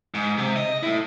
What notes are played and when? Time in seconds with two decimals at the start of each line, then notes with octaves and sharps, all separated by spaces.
0.14 G#2
0.38 C3
0.56 D#5
0.83 A3 E4